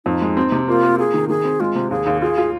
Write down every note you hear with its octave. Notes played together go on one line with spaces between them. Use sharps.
F2 D#4
G#3
C4
C3
A#3 F4
A#3
F4 G#4
D#3
D#3 G#4
C4
G#3 F4
C3
D#2 G#4
D#2
F4 G#4
F4